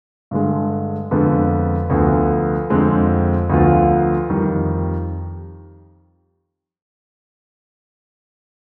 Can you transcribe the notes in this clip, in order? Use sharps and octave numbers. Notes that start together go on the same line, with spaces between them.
G2 D3 G#3
F2 D3 G#3 B3 F4
D2 D3 F3 B3
F2 D3 G#3 C4
D2 D3 F3 B3 F4
F2 D#3 G3